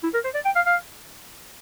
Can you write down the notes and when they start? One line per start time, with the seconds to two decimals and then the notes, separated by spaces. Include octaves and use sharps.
0.04 E4
0.14 A#4
0.24 C5
0.34 D5
0.45 G5
0.56 F5
0.66 F5